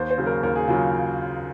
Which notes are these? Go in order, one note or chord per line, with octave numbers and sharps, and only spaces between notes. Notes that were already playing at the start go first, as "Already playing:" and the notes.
Already playing: D#2 C5
C5
C#3 F#3
A#4
D#2 A#4
G#4
C#3 F#3 F4